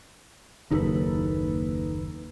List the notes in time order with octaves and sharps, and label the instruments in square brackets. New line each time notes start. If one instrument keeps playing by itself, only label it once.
[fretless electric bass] F#1 D#2 [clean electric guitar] D#4 A4 B4